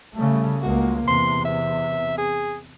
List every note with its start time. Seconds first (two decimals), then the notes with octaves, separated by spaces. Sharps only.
0.15 C#3 G3 A3
0.62 C#2 G#3 A#3 F#4
1.07 E2 C3 C6
1.45 E5
2.18 G#4